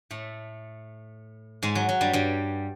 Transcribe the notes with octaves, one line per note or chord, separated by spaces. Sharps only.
A2 A3
G#2 G#3
F#3
F#3
G2 G3
G2 G3